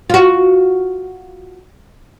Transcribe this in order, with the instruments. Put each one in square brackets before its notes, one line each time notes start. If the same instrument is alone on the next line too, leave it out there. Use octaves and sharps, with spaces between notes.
[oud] F4 F#4